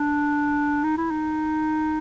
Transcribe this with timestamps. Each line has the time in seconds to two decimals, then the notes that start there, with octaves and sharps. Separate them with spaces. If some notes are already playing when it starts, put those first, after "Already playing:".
Already playing: D4
0.84 D#4
0.98 E4
1.11 D#4